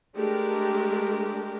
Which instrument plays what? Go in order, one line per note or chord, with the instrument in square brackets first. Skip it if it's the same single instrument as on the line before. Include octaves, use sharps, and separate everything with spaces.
[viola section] G#3 A3 D4 G4 A#4